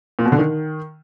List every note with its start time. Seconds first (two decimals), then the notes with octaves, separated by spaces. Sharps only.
0.19 A#2
0.25 B2
0.32 D3
0.39 D#3